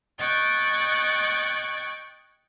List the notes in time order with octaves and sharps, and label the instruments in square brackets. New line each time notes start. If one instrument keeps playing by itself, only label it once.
[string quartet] D#5 G5 C#6 F#6 G#6 A6